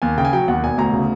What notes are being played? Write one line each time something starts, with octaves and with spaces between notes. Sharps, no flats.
D#2 G#5
C#3 G5
G#5
F#3 G5
D#2 F#5
E1 G#5
D2 A#5
C#3